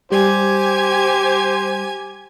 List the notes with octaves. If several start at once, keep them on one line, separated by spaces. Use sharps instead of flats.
G3 G4 C5 G#5 G#6